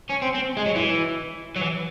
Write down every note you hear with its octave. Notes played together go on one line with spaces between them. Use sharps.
C#4
C4
C4
G#3
F#3
E3
F#3
E3